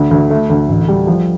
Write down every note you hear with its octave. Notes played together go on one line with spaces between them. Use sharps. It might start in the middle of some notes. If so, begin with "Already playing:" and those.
Already playing: D2
D2
A3
D2
A1
G3
F3